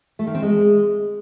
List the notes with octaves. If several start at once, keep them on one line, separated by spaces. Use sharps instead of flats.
A3
D#3
C4
G#3